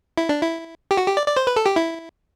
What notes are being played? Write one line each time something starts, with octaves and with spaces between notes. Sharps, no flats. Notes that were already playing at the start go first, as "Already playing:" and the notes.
E4
D4
E4
G4
F#4
G4
D5
D5
C5
B4
A4
G4
E4